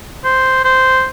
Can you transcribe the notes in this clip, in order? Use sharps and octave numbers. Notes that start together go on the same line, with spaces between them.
C5
C5